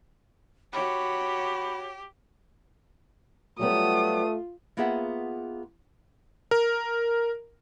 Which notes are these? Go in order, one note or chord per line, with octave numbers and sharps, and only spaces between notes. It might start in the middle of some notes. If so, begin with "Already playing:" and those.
F#4 G4 C#5 B5
F#3 G3 A3 B3 F4 D#6
A#3 B3 F4 G#4 E5 F#5
A#4